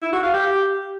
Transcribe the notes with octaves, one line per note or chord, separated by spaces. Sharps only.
E4
F#4
F5
G4